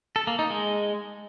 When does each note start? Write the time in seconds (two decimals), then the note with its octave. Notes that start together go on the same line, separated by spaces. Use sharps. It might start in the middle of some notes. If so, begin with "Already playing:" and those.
0.16 A4
0.27 A#3
0.39 D#4
0.50 G#3